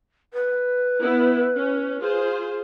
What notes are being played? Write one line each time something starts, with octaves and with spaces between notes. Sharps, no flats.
B4
B3 E4
C#4
F4 G#4 C5